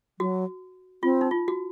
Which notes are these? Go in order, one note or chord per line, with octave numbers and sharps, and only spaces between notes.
F#3 F#4
C4 F4
D#4
F4
F#4